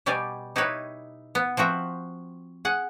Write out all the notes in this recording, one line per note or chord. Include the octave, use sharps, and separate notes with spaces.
B2 G3 G4 D5 G#5
D#4 E4 G4 B4 C#5
B3
F3 C4 F#4 E5
G#4 F#5